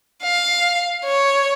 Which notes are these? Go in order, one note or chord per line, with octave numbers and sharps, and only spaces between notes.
F5
C#5